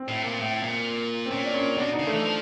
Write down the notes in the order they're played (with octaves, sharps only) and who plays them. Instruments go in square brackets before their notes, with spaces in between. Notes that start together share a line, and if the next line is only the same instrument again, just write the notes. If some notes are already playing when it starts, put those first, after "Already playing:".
Already playing: [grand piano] C4
[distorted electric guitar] A2
A#2
A2
A#2
[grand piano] C4
[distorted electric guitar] A#2 [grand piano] C#4
[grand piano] D4
C#4
[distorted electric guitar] B2 [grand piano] D4
[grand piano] D#4
[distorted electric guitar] C#3
[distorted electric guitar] E3 [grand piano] A3
[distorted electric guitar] F3